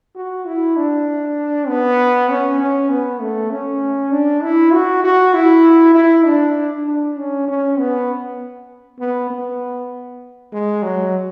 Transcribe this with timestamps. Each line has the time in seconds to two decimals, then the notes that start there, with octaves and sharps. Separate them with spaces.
0.16 F#4
0.46 E4
0.76 D4
1.68 B3
2.29 C#4
2.60 C#4
2.89 B3
3.21 A3
3.50 C#4
4.12 D4
4.43 E4
4.73 F#4
5.04 F#4
5.34 E4
5.94 E4
6.26 D4
6.87 D4
7.18 C#4
7.48 C#4
7.79 B3
9.00 B3
9.30 B3
10.52 G#3
10.83 F#3